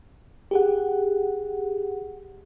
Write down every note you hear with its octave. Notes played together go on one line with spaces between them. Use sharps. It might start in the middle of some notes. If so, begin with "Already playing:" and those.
G4 G#4 F#5